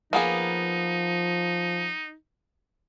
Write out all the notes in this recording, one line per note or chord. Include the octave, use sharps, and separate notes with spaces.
F3 A#3 B3 D#4 G#4